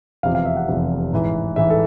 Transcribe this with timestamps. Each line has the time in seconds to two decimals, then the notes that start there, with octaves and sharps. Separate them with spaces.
0.23 F1 E2 C3 F3 F5
0.35 F5
0.45 E5
0.57 F#5
0.68 F1 E2 C3 F3
1.12 A1 G#2 E3
1.56 A1 G#2 E3 E5
1.70 A4